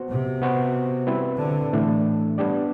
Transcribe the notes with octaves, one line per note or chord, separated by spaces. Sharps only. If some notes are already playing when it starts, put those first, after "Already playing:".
Already playing: B3 F#4 C5
C3
B3 F#4 C5
G3 C4 E4 B4
D3
A2 E3 A3 D4
G3 B3 D4 G4 D5